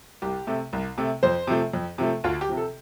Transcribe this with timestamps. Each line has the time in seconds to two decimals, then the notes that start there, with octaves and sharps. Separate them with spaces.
0.22 C2 G4
0.47 C3 A3
0.73 C2
0.98 C3 A3
1.23 F2 C5
1.47 C3 F3 A3
1.74 F2
1.98 C3 F3 A3
2.24 D2 F4
2.41 G4
2.49 C3 F3
2.57 A4